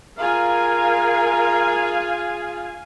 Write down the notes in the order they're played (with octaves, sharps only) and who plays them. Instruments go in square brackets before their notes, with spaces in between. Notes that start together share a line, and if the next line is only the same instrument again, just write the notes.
[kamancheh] F4 G#4 [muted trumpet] A#4 [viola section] F5 G#5